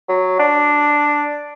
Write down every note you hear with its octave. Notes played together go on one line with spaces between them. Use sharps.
F#3
D4